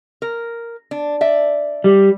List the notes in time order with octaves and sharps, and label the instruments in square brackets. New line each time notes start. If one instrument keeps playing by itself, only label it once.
[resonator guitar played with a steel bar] A#4
D4
D5 E5
[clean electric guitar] G3